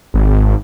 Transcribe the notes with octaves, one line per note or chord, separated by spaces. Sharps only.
G#1